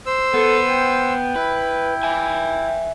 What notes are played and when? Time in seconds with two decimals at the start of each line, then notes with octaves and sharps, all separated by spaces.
0.06 C5 E6
0.34 B3 A4
0.67 G5
1.36 E4 B4
2.03 E5 G#5